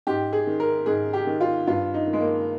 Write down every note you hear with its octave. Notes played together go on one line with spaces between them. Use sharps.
G#2 G4
G#4
D#3
A#4
G#2 G#4
G4
D#3
F4
G2 F4
D#4
D#3
G#3
A#3